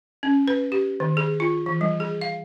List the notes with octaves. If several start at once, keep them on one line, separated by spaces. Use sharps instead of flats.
C#4
B4
G4
D#3
G#4
F4
E3
G3
G#4
F5